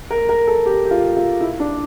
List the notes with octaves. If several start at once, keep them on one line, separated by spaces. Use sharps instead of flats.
A#4
A#4
A4
G4
G4
F4
F4
E4
D4